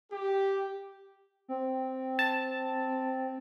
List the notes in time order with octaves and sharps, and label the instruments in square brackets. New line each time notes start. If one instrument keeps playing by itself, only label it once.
[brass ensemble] G4
[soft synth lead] C4
[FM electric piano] A5